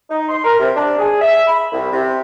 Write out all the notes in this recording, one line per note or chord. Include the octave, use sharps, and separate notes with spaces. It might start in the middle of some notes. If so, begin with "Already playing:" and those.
D#4
C6
A#4
C3
D4
G#4
E5
B5
C2
C3